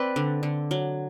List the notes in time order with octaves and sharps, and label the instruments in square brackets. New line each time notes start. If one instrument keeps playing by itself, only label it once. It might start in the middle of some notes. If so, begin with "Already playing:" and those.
Already playing: [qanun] C4 B4 D5
D3
D3
F#3